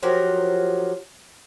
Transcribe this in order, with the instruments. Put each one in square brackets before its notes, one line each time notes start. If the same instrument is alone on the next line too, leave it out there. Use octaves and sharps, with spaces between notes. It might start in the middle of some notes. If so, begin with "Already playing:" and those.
[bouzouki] F3 F#3 G4 A#4